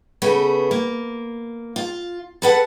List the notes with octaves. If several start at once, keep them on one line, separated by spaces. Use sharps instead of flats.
C#3 A3 B3
A#3
F4
A4 B4 F#5